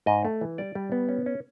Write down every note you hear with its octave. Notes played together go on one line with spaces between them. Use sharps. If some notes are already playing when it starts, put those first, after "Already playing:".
G#2 D#5
A3
E3
G3 D5
G3
B3
C#4
C#4